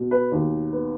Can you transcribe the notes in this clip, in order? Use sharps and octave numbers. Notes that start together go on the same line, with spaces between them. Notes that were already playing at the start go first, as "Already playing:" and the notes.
Already playing: B2
B4
D#2
B3